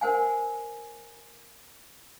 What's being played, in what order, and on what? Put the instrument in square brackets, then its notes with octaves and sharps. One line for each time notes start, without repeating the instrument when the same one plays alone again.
[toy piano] A#4 C5 F#5 G#5